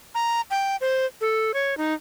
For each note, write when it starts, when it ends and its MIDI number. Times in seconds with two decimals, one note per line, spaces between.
0.15 0.41 82
0.51 0.76 79
0.81 1.06 72
1.21 1.52 69
1.54 1.77 73
1.77 1.94 63